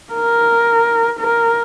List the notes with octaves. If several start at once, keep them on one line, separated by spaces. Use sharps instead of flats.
A#4
A#4